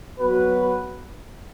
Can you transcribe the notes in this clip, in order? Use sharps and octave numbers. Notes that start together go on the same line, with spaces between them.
F#3 B3 F#4 B4